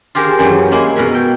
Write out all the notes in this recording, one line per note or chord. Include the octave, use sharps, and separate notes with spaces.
F4 G4 G#4 A#4 C5
F#2 E3 F#3
G#3 A#3 E4 G#4
B2 A#4 B4 G#5
G5